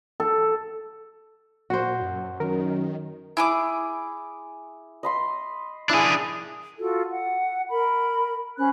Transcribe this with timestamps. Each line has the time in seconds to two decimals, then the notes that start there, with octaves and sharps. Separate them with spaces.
0.20 A4
1.70 A#2 F#4 C5
2.02 F#2
2.40 F#2 D#3 A#4
3.37 E4 G#4 D6
5.03 D#5 B5 C6
5.90 D4 E4 G#4 G#5
6.78 F4 F#4 A4
7.09 F#5
7.69 A#4 B5
8.57 C#4 C5 B5 F#6